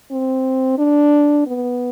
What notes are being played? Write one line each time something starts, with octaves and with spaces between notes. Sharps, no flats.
C4
D4
B3